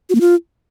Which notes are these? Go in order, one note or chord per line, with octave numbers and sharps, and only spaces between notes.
F#4
A#3
F4